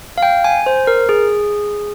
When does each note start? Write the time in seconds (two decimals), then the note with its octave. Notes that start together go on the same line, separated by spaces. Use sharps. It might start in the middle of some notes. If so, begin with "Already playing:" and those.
0.18 F5
0.23 G5
0.44 G#5
0.66 C5
0.87 A#4
1.09 G#4